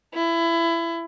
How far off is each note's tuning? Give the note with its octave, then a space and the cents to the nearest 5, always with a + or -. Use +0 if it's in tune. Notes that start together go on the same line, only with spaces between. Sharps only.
E4 +25